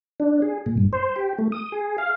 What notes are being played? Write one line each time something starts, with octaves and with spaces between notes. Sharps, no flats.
D4
G#4
A#2
G2
C5
G4
A3
D#6
G#4
F5